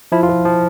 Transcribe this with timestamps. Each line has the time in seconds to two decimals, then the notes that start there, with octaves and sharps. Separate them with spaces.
0.12 F3 E4
0.23 F4
0.29 F3
0.45 F3